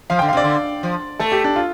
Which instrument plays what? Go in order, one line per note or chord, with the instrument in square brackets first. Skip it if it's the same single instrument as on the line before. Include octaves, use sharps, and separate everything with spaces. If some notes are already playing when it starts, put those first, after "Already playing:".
[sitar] F3 [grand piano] F5
[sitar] D3 [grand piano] G5
[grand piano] F5
[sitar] C3 [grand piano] D5
[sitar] D3
F3
[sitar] A3 [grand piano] A4
[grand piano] G4
D4
F4